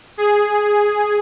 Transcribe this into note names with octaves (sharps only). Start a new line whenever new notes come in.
G#4